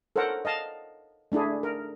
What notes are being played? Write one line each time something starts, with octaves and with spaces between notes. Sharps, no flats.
A4 A#4 C5 C#5 F#5
D#5 F5 A5
A3 D4 E4 G#4
A#4